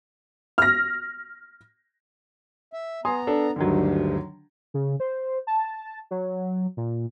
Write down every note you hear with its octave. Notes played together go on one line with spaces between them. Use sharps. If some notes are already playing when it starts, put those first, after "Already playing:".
F6 A#6
E5
B3 G#5 A#5 C6 D#6
D4 A4
D2 G2 D3 D#3 F#3
C#3
C5
A5
F#3
A#2